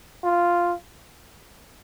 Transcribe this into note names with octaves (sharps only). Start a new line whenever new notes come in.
F4